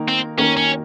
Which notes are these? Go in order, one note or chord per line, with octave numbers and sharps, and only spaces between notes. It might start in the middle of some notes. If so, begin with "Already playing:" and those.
Already playing: D#3 A#3 D#4 A#4
C4
D#3 A#3 C#4 D#4 A#4
C#4